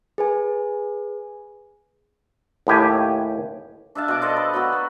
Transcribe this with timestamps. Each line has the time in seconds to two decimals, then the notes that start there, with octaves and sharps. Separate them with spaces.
0.18 G#4 B4 G#5
2.67 D#2 A2 G4 G#5
3.95 D4 E5 F5 A5
4.08 B2 D6
4.22 A4 C5 D5 D#5
4.36 B4
4.53 F#3 B3 F#4
4.72 B3